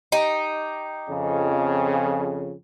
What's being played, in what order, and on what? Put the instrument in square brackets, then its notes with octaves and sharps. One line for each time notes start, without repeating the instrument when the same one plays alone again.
[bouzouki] D#4 G4
[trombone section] F2 C#3